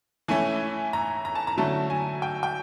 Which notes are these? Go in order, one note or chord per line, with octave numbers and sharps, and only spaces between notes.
E3 A3 C#4 E4 G#5
A#5
A#5
A5
A#5
D3 F#3 A3 C#4 E4 A5
G#5
G5
G5